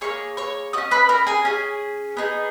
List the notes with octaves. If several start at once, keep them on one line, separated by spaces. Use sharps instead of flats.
A#3 E4 G#4 C#5 C#6
C#5 C#6
C#4 F#4 D#5 D#6
B4 B5
A#4 A#5
G#4 G#5
C#4 G#4
B3 D#4 G#4